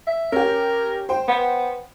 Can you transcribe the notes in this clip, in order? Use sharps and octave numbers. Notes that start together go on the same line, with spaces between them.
E5
C#4 G4 A#4
C5 G5
B3